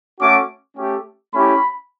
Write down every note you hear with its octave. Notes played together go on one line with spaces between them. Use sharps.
A3 C#4 F#4 D6
A3 C#4 G4
A3 C#4 E4 G4 B5